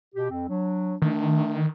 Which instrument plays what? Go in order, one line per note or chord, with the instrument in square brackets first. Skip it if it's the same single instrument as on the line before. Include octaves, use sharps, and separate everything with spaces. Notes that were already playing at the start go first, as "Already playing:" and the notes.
[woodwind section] B2 G4
F2 C4
F#3 D4
[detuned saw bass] D#3 [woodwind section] A3 D4